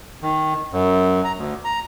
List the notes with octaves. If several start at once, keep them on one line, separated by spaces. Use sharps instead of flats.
D#3
F#2
A#5
D2
A#5